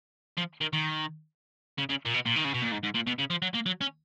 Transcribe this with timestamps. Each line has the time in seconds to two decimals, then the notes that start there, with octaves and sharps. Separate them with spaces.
0.37 F3
0.61 D#3
0.73 D#3
1.78 C#3
1.89 C#3
2.05 A#2
2.14 B2
2.26 A#2
2.36 D#3
2.45 C#3
2.54 B2
2.62 A#2
2.72 G#2
2.84 G#2
2.95 A#2
3.07 B2
3.19 C#3
3.30 F3
3.42 F#3
3.54 A#3
3.66 F#3
3.81 C#4